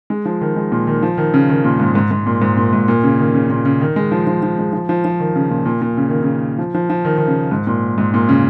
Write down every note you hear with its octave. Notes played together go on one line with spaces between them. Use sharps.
G#3
F3
D#3
G#3
A#2
D#3
F3
D#3
C#3
D#3
A#2
G#2
G#2
G#2
A#2
G#2
A#2
G#2
A#2
C#3
D#3
C#3
A#2
C#3
D#3
G#3
F3
F3
F3
G#3
F3
F3
F3
D#3
C#3
A#2
A#2
A#2
C#3
D#3
C#3
F3
F3
F3
D#3
D#3
C#3
G#2
A#2
G#2
A#2
C#3